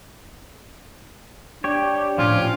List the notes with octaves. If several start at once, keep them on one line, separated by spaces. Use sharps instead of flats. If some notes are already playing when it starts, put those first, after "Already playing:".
D4 G4 C#5
A2 F3 C#4 D4 F4 G4